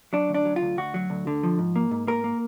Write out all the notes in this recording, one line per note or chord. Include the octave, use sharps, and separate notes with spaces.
F#3 D4
D2
D4
F#3
F4
D2
D2 F#4
F#3
D2
D3
F3
G#2
A#3
G#2
A#3 A#4
A#3